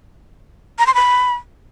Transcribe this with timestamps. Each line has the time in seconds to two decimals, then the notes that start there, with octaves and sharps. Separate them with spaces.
0.79 A#5
0.87 C6
0.94 B5